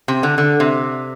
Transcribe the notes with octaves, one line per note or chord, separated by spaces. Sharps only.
C3
D3
D3
C3